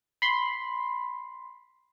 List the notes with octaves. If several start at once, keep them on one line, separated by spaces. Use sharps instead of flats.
B5 C6